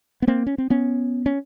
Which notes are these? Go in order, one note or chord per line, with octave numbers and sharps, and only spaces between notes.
B3
A#3 C4
C#4
C4
B3 C#4
C#4